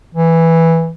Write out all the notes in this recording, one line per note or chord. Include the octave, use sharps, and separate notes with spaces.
E3